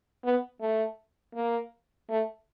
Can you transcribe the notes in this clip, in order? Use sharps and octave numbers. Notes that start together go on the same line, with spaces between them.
B3
A3
A#3
A3